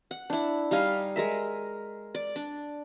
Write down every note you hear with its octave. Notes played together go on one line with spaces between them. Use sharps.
F#5
D4 E4
G3 D#4 F5 G#5
G#3 A#4 E5
D5
D4